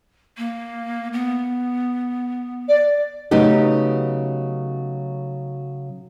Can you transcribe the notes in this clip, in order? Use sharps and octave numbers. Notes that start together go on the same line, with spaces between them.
A#3
B3
D5
C#3 F#3 A3 B3 D#4 G4